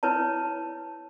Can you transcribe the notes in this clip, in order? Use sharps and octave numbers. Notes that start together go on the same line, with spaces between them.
E4 B4 C#5 A5